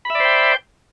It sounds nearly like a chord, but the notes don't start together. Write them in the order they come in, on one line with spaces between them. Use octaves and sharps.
B5 E5 D5 C5 G5